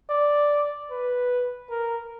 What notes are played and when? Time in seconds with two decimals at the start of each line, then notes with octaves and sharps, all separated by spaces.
0.10 D5
0.91 B4
1.70 A#4